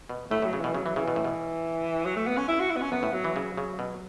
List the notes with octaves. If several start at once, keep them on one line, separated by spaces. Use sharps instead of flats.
B2
A2 A3
A2
F#3
C#3
B2 E3
C#3 F#3
E3
C#3 E3
B2
A2
B2
F#3
A3
B3
C#4
E4
F#4
E4
B3
C#4
F#2 B3
A2
F#3
E3
C#3
C#3
B2